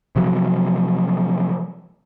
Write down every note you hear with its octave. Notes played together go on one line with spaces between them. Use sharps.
C3 F3 F#3